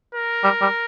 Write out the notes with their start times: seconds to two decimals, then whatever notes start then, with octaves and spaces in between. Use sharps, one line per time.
0.15 A#4
0.44 G3
0.61 G3